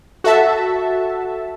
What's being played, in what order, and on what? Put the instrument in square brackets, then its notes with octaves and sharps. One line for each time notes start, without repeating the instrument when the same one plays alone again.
[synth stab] F#4 A4 E5 A5